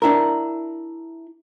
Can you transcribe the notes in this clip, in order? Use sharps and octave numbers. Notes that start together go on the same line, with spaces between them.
D4 E4 A#4